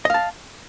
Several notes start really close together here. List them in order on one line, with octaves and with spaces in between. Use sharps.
D#5 F5 A5